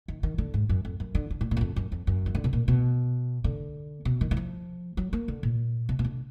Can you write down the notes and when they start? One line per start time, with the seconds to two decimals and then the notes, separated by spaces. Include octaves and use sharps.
0.08 D#3
0.23 D#3
0.38 D3
0.54 G#2
0.69 F#2
0.85 F2
1.00 F#2
1.15 D3
1.31 D3
1.41 A#2
1.51 A#2
1.57 F#2
1.61 F2
1.76 F#2
1.92 F2
2.07 F#2
2.26 D#3
2.35 D3
2.44 B2
2.53 A#2
2.68 B2
3.44 D3
4.05 B2
4.21 D#3
4.31 D#3
4.37 F3
4.97 F#3
5.13 A#3
5.28 D3
5.43 A#2
5.89 B2
5.99 B2
6.04 D3